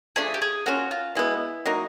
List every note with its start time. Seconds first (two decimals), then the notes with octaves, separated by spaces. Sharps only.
0.16 F3 A3 D4 G#4
0.34 G4
0.42 G#4
0.66 A#3 C#4 F4 F#4
0.91 F4
1.15 B2 G#3 B3 E4
1.66 F#3 A#3 D#4 F#4